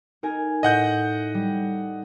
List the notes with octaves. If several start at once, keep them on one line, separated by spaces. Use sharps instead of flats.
D#4 A#4 G#5
A2 D#5 F#5 G6
G3